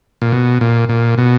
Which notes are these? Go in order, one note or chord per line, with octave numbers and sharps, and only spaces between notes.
A#2
B2
A#2
A#2
B2